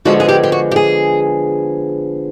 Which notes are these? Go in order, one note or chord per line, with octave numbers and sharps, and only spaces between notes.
D3 F3 G#3 B3 F#4
G#4
G4
G4
F#4
G4
G#4